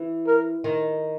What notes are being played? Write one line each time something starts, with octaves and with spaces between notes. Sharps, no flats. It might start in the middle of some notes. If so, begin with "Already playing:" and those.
Already playing: E3
A#4
D#3